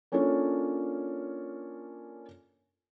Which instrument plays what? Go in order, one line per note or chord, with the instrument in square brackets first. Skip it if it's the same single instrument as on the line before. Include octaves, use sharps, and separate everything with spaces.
[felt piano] A#3 C#4 D4 F4 A4 C#5